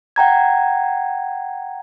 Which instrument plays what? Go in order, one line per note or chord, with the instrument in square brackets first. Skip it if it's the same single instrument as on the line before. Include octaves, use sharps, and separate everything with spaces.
[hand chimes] F#5 G5 A#5 G#6